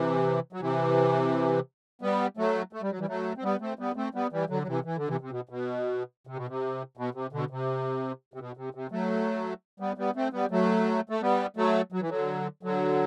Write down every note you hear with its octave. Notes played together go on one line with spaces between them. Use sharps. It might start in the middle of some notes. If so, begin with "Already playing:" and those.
Already playing: C3 E3
F#3
C3 E3
G3 B3
F#3 A3
A3
G3
F#3
E3 G3
F#3 A3
C4
G3 B3
A3 C4
G3 B3
A3 C4
G3 B3
E3 G3
D3 F#3
F#3
C3 E3
E3
D3
C3 E3
C3
B2
B2
C3
B2
C3
B2
C3
B2 D3
C3
C3
B2
C3
C3
F#3 A3
G3 B3
G3 B3
A3 C4
G3 B3
F#3 A3
A3
G3 B3
F#3 A3
F#3
E3
D3 F#3
D3 F#3